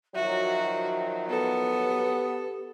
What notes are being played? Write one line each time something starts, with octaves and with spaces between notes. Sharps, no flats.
D#3 F3 F#3 F#4 E5
B3 A4
G4